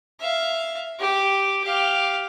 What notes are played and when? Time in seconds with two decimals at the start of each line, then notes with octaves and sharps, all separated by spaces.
0.21 E5 F5
0.99 G4
1.64 G4 F5